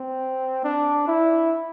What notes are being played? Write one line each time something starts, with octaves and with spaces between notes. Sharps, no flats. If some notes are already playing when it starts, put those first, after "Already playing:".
Already playing: C4
D4
E4